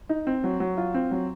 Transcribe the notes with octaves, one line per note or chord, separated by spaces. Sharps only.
D#4
C4
F#3
F#3
F4
C4
F#3